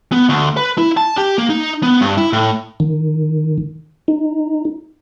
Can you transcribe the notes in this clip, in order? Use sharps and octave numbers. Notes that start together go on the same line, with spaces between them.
B3
D2
B4
E4
A5
G4
A#3
D#4
B3
G2
E4
A2
D#3
D#4